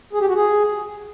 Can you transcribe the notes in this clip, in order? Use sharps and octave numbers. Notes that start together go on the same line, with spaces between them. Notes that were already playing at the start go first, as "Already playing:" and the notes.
G#4
G4
F#4
G#4